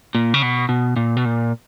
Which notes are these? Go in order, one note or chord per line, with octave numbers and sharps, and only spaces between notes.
A#2
C#3
B2
B2
A#2
B2
A#2